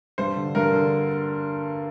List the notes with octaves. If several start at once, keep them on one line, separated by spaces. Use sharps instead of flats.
G2 C5
D3
G2 A#4
D3